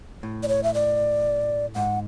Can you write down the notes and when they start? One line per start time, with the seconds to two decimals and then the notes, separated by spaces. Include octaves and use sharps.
0.23 A2
0.43 D5
0.48 C#5
0.63 E5
0.74 D5
1.76 G#2 F#5